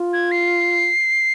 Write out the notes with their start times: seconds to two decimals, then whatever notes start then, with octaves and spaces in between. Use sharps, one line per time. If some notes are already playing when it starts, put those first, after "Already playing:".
Already playing: F4
0.13 G#6
0.32 C7